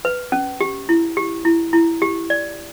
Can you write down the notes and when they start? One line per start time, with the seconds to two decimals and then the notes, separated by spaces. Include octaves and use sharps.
0.05 B4
0.32 C#4
0.61 G4
0.89 E4
1.17 G4
1.45 E4
1.73 E4
2.02 G4
2.30 D5